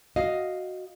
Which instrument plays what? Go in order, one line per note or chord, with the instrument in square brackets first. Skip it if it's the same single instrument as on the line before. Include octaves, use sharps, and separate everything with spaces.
[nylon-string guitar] F#4 D#5 F5